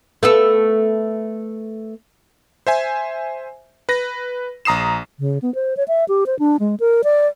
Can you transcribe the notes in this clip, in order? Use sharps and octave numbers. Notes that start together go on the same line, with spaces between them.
A3 B3 A4
C5 E5 G#5
B4 A#6
A#1 A#5 D#6 C7 E7
C#3
B3
C5
C#5
E5
G4
C5
D4
G#3
A#4
D5